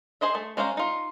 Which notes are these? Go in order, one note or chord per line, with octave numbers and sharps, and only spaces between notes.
G#4 C5 D#5 E5
A3
G#3 C#4 C5 F5 A#5
D#4 F4